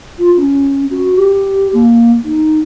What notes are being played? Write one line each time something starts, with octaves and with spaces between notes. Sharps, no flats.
F4
C#4
F#4
G4
A#3
D#4